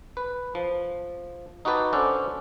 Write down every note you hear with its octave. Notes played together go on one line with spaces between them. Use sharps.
B4
F3
D#4 F#4 G4 B4 A5
C#4 D4 A4 C5 D5 F#5